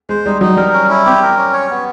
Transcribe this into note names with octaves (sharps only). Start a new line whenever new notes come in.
G#3 C5
G3 D#4
F#3 D#4
G3 A#4
C#4
E4
C4 G4
A#4
C#4
C#5
B3